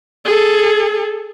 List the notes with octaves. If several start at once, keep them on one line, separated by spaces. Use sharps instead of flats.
G#4 A4